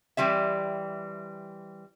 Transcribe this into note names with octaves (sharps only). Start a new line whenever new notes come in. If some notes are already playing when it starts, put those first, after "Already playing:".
E3 G3 C4 E5